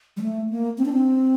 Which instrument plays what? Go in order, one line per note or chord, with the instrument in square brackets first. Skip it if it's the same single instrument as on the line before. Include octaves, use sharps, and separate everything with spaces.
[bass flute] G3
A3
A#3
C4
D4
C4